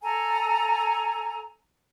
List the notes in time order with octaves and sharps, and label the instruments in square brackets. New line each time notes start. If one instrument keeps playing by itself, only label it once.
[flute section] A4 G#5 A#5